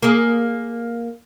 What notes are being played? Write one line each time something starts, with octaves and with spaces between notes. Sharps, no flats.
A#3 G#4